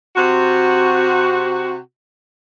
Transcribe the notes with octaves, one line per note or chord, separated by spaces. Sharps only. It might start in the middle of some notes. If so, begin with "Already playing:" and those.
C3 F#4